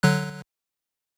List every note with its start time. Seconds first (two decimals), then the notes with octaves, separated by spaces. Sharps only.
0.03 D3 F#3 F#6